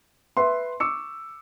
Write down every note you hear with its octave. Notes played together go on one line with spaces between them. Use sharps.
B4 E5 C6
C#6 D6 E6 C#7